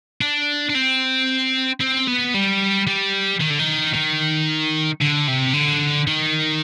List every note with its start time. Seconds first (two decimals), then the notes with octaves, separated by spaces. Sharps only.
0.21 D4
0.70 D4
0.75 C4
1.81 C4
2.08 B3
2.34 G3
2.88 G3
3.41 D#3
3.50 D3
3.59 D#3
3.94 D#3
5.01 D3
5.28 C3
5.54 D3
6.07 D#3